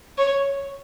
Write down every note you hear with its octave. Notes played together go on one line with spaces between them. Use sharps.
C#5